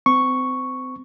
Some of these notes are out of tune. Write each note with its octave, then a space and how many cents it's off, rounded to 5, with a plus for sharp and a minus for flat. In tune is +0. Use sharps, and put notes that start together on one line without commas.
C4 -30 C#6 +0